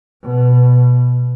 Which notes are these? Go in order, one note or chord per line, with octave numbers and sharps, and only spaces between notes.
B2